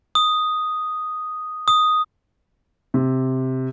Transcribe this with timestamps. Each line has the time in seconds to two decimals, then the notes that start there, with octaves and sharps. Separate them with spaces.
0.15 D#6
1.68 D#6
2.94 C3